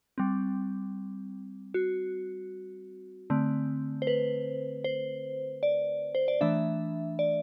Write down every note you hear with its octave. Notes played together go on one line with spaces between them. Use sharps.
G3 C4
F#4
D3 A3 C4
C5
B4
C5
D5
C5
D5
E3 A3 D4 E5
D5